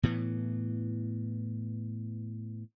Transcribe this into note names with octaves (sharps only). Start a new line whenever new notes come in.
A2 E3 B3